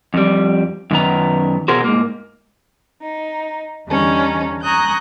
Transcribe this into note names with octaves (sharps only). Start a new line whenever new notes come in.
F2 G3
F#2 D#3 B3 A#5
B2 F#4 G#4 A#4 C5
G#2 A#3
D#4
E2 D3 G3 C#4 D#4
G#5 A#5 C#6 D#6 F#6 G6